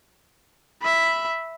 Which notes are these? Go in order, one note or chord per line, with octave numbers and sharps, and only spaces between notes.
E5 B5